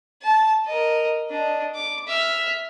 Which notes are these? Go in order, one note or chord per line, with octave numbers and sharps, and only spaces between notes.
A5
A#4 D#5
D4 D#5
D6
E5 F6